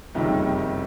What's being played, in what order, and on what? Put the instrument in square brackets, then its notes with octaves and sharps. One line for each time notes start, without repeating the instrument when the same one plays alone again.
[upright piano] F#1 F2 C3 D#3 G3